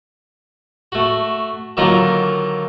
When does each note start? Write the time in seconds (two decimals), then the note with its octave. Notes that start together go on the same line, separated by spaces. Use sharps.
0.92 A3 F#4
1.77 D3 D#3 F#3 A#3 F4 A#4